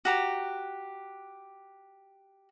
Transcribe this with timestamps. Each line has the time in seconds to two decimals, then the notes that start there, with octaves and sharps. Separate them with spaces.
0.05 F#4 G4 A#5